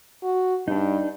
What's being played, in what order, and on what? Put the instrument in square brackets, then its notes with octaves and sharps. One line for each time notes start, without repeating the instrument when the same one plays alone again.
[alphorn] F#4
[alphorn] G2 [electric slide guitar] D4 D#4